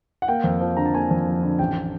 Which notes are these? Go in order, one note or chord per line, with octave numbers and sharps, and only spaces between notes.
F#5
A#3 G5
F2
F3
D3 A#5
A5
A#3 G#5
F2
F3
D3
A1 G5